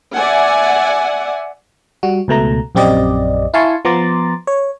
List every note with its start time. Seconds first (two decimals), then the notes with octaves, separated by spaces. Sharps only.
0.16 D5 E5 F#5 G#5
2.03 G3 F#4
2.28 C#2 B2 A3 A#5
2.75 A#1 F#2 C4 G4 D5 D#5
3.54 E4 F5 G#5 A5 C6 C#6
3.85 F3 B3 A#5 C6 D6 A6
4.47 C#5